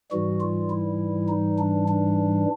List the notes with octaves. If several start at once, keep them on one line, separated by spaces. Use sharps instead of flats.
G#2 E3 G3 F#4
F4
E4
D#4
D4
D4